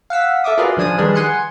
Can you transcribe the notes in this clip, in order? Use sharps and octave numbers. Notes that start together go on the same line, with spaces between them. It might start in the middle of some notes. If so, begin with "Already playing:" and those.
F5 F#5 E6 B6
A4 E5 D6 D#6
F4 F#4 G#4 A#4 B4 D5
C#3 F3 D4 G#5 D#6 D#7
D#3 G3 G#3 D4 G#4 B4
F#5 G#5 C6 C#7